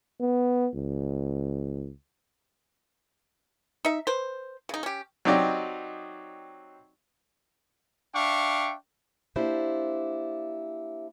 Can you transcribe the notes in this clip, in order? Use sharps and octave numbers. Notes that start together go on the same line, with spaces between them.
B3
C#2
D#4 E5
B4 C5
C#3 D#4
C#4 G4
F#3 C4 D#4 G4 D5 D#5
D4 E5 F5 G5 C#6
A#3 D4 E4 G4 C5 D5